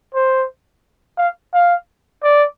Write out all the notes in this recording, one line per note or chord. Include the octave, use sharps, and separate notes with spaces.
C5
F5
F5
D5